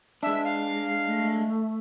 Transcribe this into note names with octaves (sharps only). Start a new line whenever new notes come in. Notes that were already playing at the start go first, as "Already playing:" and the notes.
G#3 D4 E5
F5
A3